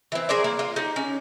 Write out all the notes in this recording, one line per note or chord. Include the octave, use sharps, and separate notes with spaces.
E3 C4
G#4 A#4 C5 D5
A#3
F4
D#4 G4
C#4